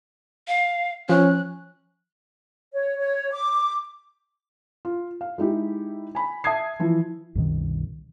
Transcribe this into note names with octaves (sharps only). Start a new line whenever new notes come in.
F5
F3 C#4 F#6
C#5
C#5
D6
F4
F5
G#3 D#4 E4 G4
G#5 B5
E5 A5 D#6 G#6 C7
E3 F3
C2 F#2 B2 D#3